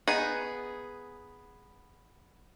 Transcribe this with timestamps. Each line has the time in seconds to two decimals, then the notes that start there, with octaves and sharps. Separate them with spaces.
0.08 B3 D#4 G#4